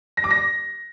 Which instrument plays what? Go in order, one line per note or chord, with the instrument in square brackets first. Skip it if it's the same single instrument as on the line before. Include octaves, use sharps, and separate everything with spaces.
[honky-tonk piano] A#6
D6
A#6